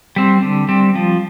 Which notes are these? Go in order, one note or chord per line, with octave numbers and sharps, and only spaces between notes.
G3 C4
D3
G3 C4
F3